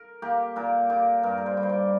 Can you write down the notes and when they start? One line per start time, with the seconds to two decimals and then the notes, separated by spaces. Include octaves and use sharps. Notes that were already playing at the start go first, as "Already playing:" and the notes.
Already playing: A#4
0.22 A#3 G4
0.56 A#2 A#4
0.90 A#2 G4
1.23 G2 A#4
1.38 A#4
1.46 C5
1.57 G3
1.63 C5
1.69 D5